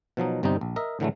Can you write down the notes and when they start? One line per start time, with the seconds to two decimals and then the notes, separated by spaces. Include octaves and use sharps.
0.17 B2 F3 F#3 D#4
0.43 G1 C3 G3 C4 D#4 G5
0.61 A#1
0.76 A#4 D#5 E5
1.00 A2 D3 E3 F#3 G#3 A3